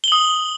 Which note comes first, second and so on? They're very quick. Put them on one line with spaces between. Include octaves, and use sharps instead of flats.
G7 F#7 D#6